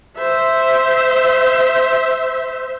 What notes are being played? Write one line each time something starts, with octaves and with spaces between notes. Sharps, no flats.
C5 E5